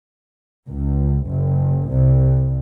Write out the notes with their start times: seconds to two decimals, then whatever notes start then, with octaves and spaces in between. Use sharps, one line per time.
0.69 C#2
1.27 F#1
1.89 C2